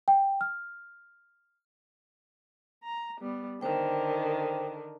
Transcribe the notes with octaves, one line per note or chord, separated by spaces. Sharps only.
G5
F6
A#5
G3 B3
D3 D#3 C5 G5